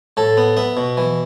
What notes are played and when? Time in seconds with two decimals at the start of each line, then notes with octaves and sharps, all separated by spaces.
0.17 A2 A4
0.37 B3
0.57 B3 E5
0.77 B2
0.97 E3